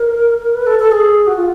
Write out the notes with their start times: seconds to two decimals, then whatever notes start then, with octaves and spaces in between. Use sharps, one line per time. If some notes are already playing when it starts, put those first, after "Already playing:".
Already playing: A#4
0.55 B4
0.67 A4
0.79 A4
0.92 G#4
1.27 F#4
1.37 F4